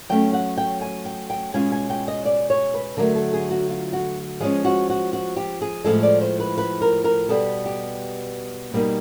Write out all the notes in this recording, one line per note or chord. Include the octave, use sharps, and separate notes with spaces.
F#3 A3 C#4 G5
F#5
G5
G#5
G5
G5
B2 G#3 C#4 F4 G#5
G#5
G5
D#5
D5
C#5
B4
D3 F#3 A3 A#4
A4
G#4
F#4
F4
F#4
F3 G#3 C#4 G#4
F#4
F#4
F#4
G4
G#4
A2 F3 G#3 A4
D5
C5
B4
B4
A#4
A#4
B2 G3 B3 A4
G4
B2 G3 A#3 D#4